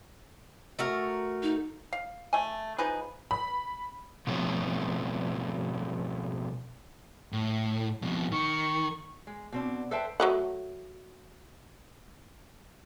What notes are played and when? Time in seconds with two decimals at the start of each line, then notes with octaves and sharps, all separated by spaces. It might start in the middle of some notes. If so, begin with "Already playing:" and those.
0.79 A3 F#4 A#4
1.43 D#4
1.93 F5
2.33 A3 G#5
2.78 F3 D#4 G#4 B4
3.31 B5
4.27 B2 F3 G3 A3 C4 C#4
7.33 A2
8.02 F2 B2
8.32 D#3 C#6
9.27 G#3
9.52 B2 C4 D4
9.91 A4 B4 C5 E5 G5 A5
10.20 F#3 A3 F#5